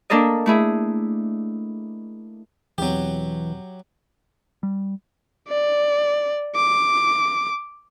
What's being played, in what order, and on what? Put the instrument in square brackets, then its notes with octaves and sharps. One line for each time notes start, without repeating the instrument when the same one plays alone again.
[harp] A#3 D4 A4 A#4 D#5
A3 E4 G#4
[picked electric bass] E1 E2 C4 [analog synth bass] E3 [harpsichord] F#3 G4
[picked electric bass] G3
[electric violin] D5
D6